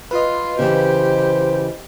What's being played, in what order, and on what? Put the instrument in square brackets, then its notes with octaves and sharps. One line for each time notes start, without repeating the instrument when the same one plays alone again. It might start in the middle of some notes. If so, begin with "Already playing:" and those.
[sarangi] F4 [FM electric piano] B4 D#5
[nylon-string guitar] C#3 E3 [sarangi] G4 [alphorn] C5